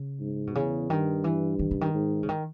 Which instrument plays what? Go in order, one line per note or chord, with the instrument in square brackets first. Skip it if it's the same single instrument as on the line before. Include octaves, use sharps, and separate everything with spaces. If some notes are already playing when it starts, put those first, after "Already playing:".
Already playing: [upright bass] C#3
[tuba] G#2
[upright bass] B2
[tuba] E2 [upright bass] C#3
[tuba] G2 [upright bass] D#3
[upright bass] E3
D#3
C#3
D#3
[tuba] G#2
[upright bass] C#3
D#3